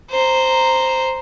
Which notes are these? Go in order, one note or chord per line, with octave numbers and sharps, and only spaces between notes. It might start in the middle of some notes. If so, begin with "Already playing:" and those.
C5 A#5